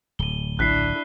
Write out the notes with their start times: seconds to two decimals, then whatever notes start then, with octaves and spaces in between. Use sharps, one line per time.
0.19 D1 D#7 G7
0.59 A#1 D4 E4 F#6 B6 C7